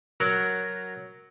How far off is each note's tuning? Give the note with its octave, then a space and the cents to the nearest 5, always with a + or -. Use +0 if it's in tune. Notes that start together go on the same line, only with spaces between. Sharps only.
F#3 +5 F#4 +0 A#4 +0